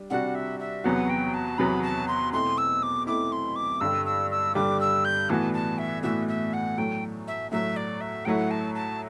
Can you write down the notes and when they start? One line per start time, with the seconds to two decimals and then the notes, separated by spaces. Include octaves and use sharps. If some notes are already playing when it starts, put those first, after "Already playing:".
Already playing: G3 D4
0.10 C3 G3 D4 F#4 F#5
0.35 E5
0.60 E5
0.84 E2 C3 F#3 B3 F#4 F#5
1.10 G5
1.34 A5
1.58 E2 C3 F#3 B3 F#4 B5
1.83 A5
2.08 C6
2.33 B2 A3 C4 E4 C6
2.58 E6
2.83 D6
3.07 B2 A3 C4 E4 D6
3.32 C6
3.56 D6
3.80 G2 D3 G3 E6
4.06 E6
4.31 E6
4.55 G2 D3 G3 D6
4.80 E6
5.05 G6
5.30 A2 E3 B3 F#4 A5
5.54 A5
5.79 E5
6.03 A2 E3 B3 F#4 E5
6.28 E5
6.53 F#5
6.78 A2 F#3 A3 G5
7.28 E5
7.51 A2 F#3 A3 E5
7.77 D5
8.01 E5
8.25 A2 F#3 A3 E4 F#5 G5
8.51 A5
8.75 A5